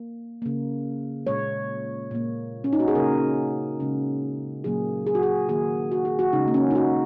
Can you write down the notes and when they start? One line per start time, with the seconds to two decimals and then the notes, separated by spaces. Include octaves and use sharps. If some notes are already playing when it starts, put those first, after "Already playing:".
Already playing: A#3
0.42 C#3 A#3
1.26 A#2 G#3 C#5
2.11 A#2 A#3
2.64 C#4
2.73 D#4
2.80 F#4
2.88 G#4
2.95 C#3 A#3 A#4
3.80 C#3 G#3
4.64 A#2 F#3 A#3 G#4
5.07 G#4
5.15 F#4
5.23 G#4
5.48 D#3 A#3 G#4
5.92 F#4
6.05 G#4
6.19 F#4
6.33 C#3 G#3 D#4
6.48 A#3
6.54 C#4
6.71 D#4
6.75 F#4